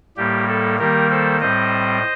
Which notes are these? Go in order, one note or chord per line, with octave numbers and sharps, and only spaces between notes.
A2 G3 A#3 G4
A4
D#3 G3 A#3 G4 A#4
A4 C5
A2 G3 C4 C5 D#5